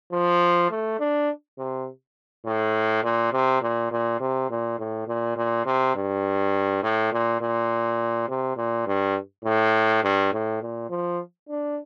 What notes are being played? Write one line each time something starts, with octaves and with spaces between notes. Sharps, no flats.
F3
A3
D4
C3
A2
A#2
C3
A#2
A#2
C3
A#2
A2
A#2
A#2
C3
G2
A2
A#2
A#2
C3
A#2
G2
A2
G2
A2
A#2
F3
D4